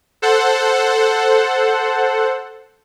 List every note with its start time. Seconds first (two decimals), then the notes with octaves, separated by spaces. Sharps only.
0.22 A4 C5 F#5